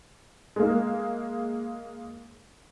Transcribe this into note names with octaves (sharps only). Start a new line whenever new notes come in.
G#3 A#3